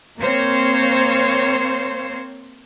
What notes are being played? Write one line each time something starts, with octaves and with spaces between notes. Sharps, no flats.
A#3 C4 C5 C#5 F5